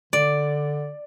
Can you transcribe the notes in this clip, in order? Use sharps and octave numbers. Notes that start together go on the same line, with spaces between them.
D3 D5